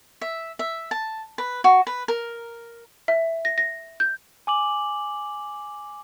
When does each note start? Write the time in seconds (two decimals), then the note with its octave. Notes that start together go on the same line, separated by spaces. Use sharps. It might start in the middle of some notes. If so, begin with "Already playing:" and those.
0.21 E5
0.59 E5
0.91 A5
1.38 B4
1.64 F#4
1.87 B4
2.08 A#4
3.08 E5
3.45 A#6
3.58 A#6
4.00 G6
4.47 G#5 D6 F#7